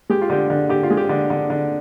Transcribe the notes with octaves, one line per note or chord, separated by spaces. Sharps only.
G#3 G4
F4
D3 G4
D3
D3 G4
F4
G#3
G4
D3
D3
D3